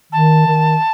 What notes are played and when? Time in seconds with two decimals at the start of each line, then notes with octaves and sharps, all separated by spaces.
0.11 D#3 A5
0.46 D#3